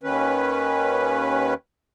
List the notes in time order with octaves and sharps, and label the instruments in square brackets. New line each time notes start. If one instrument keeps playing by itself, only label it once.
[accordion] D#2 D#3 C#4 B4